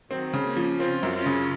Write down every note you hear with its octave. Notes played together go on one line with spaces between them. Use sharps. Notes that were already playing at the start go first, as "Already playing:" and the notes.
D#3 F#3 C4
C#3
A#3 C#4
F3
C4 C#4 F4
F#2
C#4 F4
C#3